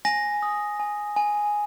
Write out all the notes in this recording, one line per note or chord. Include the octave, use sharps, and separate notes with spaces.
G#5 A#6
D#6
G#5
G#5